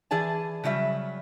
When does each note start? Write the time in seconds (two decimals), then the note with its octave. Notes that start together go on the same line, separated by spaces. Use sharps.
0.11 E3 G#4 D5 G#5 A5
0.64 C#3 F#3 G3 E5